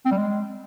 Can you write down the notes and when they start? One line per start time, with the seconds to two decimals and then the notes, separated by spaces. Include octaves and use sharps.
0.06 C4
0.11 G3
0.17 G#3